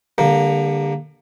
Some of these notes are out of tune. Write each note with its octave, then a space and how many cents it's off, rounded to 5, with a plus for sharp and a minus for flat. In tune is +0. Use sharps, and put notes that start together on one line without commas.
D3 +0 G3 +35 A#3 +0